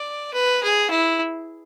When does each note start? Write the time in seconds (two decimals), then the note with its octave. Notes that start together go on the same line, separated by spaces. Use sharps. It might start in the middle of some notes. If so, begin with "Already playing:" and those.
Already playing: D5
0.34 B4
0.63 G#4
0.90 E4